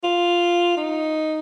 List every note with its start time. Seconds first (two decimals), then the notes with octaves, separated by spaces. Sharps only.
0.04 F4
0.77 D#4